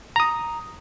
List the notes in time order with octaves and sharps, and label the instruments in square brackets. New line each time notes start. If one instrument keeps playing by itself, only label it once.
[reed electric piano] A#5 D#6